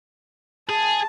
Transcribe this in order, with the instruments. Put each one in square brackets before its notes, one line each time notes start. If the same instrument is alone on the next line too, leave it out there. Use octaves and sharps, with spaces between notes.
[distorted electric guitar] G#4 [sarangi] A5